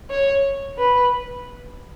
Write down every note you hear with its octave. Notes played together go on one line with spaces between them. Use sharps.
C#5
B4